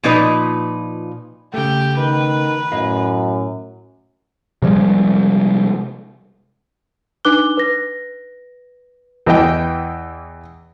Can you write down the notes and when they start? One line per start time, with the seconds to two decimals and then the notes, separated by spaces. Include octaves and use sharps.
0.03 A#2 F3 D#4 B4
1.54 C#3 A3 G4 G5
1.97 D#3 B4
2.72 F#2 A2 D#5 F5
4.62 C3 F3 G3 G#3
7.25 D4 D#4 B4 D6 F#6 G7
7.57 B4 A#6
9.26 E2 E3 D#5 G5